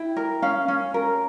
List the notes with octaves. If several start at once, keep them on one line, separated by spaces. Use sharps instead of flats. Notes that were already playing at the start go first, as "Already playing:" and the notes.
Already playing: E4 G5
A#4
C#4 F5
C#4
A#4